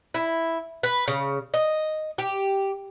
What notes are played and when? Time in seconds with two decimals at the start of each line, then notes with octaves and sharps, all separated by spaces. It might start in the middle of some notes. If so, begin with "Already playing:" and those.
0.14 E4
0.83 B4
1.08 C#3
1.54 D#5
2.18 G4